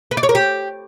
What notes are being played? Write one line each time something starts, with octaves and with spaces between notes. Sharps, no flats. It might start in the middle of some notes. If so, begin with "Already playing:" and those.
B4
D5
C#5
A#4
G4